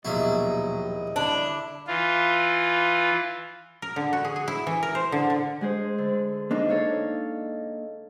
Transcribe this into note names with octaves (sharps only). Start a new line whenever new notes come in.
A#1 D#2 B2 F#3 G3 E4 D#5
D3 D4 E4
E3 F4
A#4
D3
F#4
G#4
G#4
E4
E3
A#4
C5
D3
D3
G#3 G#4 C5
D3
A#3 D4 D#4
A4 C#5 F5